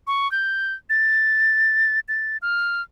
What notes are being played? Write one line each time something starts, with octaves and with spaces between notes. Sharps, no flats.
C#6
G6
A6
A6
F6